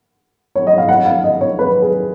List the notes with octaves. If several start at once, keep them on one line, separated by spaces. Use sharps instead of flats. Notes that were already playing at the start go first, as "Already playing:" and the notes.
C#5
D#5
F5
F#5
F5
D#5
C#5
B4
G#4